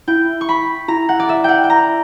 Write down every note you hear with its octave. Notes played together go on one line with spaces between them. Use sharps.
E4 G5
C#6
B5
E4 A#5
F#5
D5
E5
F#5 G5
G5
A#5